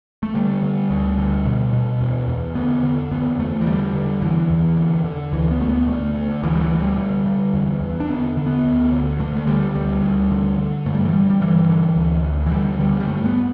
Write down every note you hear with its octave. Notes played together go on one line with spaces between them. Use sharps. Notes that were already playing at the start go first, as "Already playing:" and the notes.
A3
D3 G3
D3
D2
D2
B2
B2
E2
E2
D3 B3
D3
E2 B3
E2 A3
E3
D3 G3
D3
E2 E3
E2
D3
D3
D2 E3
B3
D2 A3
B3
D3 A3
D3
D2 E3
G3
E3
D2
G3
D3
D3
E2
E2
D4
D3 B3
D3
B3
D2
D2
D3 A3
A3
D3 G3
D2 G3
D2
D3
D3
G2 A3
G3
E3
G2 G3
G3
D3 E3
D3
D2
D2
E3
D3 G3
D3 G3
G3
G2 A3
B3